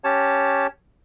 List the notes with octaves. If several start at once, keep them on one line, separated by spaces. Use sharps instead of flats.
C#4 G4 C#5 A5